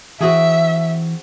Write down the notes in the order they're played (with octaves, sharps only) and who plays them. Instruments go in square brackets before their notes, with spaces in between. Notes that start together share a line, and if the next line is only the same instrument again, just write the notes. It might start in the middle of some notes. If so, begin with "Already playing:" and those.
[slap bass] E3 [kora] C4 F#4 G#4 [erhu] E5